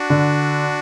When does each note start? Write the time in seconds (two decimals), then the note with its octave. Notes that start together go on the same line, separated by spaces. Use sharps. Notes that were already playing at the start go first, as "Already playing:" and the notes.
Already playing: D4 F#4
0.10 D3